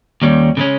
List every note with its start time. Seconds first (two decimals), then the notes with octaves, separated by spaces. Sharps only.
0.22 D#2 D#3 G3 C#4
0.57 C#3 G#3 C#4